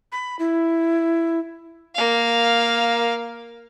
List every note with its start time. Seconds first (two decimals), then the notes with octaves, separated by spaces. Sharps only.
0.12 B5
0.39 E4
1.95 A#3 F5